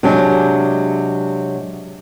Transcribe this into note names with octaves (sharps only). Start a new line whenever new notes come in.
C3 F#3 G#3 D4